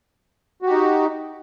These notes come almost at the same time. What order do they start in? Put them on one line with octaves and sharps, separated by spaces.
F#4 G4 D#4